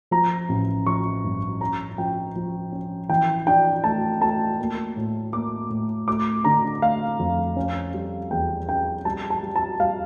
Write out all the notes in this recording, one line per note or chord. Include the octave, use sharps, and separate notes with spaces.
F3 A#5
A1
F3 C#6
G2
C#4 A#5
F3 G5
F3
C#4
E3 G5
D4 G5
A3 A5
A3 A5
A#3
A2
A#3 D6
A2
A3 D6
D3 A#5
A3 F5
F2
C#4
G3
E2 G5
C#4 G5
G3 A5
A5
G3
A5
G3 F5